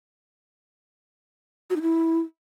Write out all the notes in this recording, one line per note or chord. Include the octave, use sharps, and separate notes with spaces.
F#4
D#4
E4